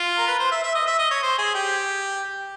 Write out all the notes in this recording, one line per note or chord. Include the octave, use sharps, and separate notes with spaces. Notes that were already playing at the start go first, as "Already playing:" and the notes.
Already playing: F4
A#4
B4
C5
E5
E5
D#5
E5
D#5
C#5
C5
G#4
G4